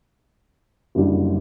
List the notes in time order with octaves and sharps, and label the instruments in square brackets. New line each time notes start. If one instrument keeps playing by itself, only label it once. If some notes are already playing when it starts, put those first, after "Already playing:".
[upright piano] F#1 F#2 D3 G3